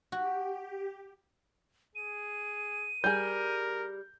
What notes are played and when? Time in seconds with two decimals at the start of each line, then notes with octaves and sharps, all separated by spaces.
0.12 F#4 G4
1.95 G#4 D#7
3.04 G3 G#4 A#4 G6